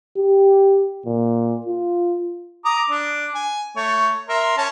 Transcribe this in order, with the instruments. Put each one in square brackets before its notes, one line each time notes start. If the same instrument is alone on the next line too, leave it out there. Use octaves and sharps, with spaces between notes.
[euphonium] G4
A#2
F4
[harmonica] A#5 D6 D#6
D4
G#5
A3 C#5
A#4 E5 C6
C#4 G#5 A5